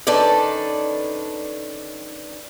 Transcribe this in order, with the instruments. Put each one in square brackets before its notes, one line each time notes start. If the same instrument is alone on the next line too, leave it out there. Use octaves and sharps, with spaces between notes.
[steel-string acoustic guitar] D#3 C#4 D4 A4 B4 D5